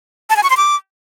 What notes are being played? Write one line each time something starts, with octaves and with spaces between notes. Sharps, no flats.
A5
G#5
C#6
C6
D6